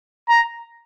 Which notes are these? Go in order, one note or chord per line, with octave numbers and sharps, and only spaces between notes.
A#5